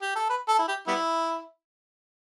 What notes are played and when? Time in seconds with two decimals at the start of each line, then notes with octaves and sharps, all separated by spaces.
0.02 G4
0.16 A4
0.30 B4
0.48 A4
0.59 E4
0.68 G4
0.87 G3 B3 E4